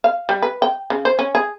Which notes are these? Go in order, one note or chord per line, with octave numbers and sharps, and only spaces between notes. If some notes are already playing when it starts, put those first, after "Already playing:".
F5
G3
B4
G5
C#3
C5
C#4
G#4